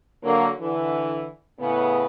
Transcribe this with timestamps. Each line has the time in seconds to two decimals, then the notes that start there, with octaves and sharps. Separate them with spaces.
0.23 D3 F#3 A#3
0.60 D3 E3
1.60 A2 C#3 B3